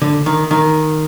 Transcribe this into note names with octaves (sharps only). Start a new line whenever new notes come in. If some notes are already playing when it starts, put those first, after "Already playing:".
D3
D#3
D#3